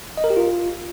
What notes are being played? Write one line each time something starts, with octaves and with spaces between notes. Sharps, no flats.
D#5
A#4
G4
F4